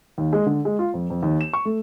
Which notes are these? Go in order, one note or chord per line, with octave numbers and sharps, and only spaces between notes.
D#2
G#3
D3
G#3
F4
F2
F2
D#2
E7
C#6
A3